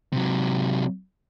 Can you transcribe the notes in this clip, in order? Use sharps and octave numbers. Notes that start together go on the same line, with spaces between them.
C3 F#3